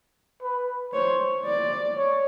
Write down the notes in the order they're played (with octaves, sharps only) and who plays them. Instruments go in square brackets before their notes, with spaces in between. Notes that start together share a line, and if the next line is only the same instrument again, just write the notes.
[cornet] B4
[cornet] C5 [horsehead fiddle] C#5
[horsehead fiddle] D5
[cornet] C#5